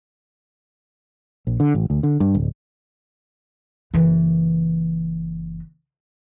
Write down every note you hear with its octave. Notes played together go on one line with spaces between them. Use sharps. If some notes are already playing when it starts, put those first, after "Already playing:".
A#1
D3
A1
D2
D3
G2
D1
F#1 E3